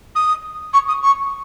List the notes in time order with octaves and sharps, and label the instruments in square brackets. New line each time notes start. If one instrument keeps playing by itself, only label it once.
[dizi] D#6
C#6
D#6
C#6